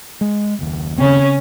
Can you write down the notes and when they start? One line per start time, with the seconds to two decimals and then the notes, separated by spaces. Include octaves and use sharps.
0.21 G#3
0.59 F#1 D#2
0.98 C#3 C4 C#4